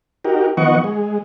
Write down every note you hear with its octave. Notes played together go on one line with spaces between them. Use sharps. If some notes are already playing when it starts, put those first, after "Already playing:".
D#4 F#4 G4 A#4
D#3 F3 B3 D#5 F#5 C#6
G#3